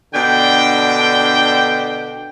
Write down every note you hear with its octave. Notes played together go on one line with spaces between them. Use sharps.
B2 D3 D4 G5